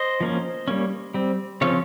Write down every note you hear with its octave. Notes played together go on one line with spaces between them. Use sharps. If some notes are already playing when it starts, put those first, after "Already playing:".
Already playing: C5 D#5
F3 A#3 C#4
G3 A#3 C#4
G3 C4
C#3 F3 C4 C#5 F5